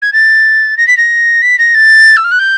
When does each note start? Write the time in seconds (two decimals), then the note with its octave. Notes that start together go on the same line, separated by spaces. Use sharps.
0.02 G#6
0.13 A6
0.77 A#6
0.87 B6
0.97 A#6
1.42 B6
1.58 A#6
1.74 A6
2.17 E6
2.24 F6
2.31 F#6
2.39 G6